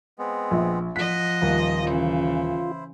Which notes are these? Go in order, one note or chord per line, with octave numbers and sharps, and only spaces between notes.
G#3 B3 C4
A#1
F3 D#5 F#5 B6
D#1 F4
C#3 E3 E4 C5